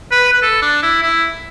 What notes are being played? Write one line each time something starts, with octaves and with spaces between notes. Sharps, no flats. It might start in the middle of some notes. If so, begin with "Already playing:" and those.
B4
B4
A4
D4
E4
E4